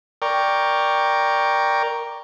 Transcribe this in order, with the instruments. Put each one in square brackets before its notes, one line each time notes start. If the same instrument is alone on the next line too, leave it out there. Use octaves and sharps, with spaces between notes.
[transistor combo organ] A#4 D5 G5 C#6